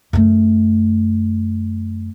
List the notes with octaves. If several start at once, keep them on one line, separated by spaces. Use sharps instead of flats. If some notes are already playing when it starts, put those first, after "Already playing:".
F#2 A3